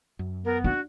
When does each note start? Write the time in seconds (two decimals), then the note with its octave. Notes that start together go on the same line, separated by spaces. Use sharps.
0.19 F#2
0.44 B3 A#4
0.64 D4 F#4